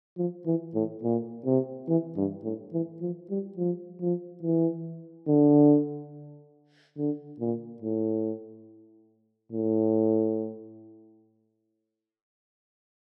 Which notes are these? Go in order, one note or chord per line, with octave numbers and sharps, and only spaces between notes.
F3
E3
A2
A#2
C3
E3
G2
A2
E3
F3
G3
F3
F3
E3
D3
D3
A#2
A2
A2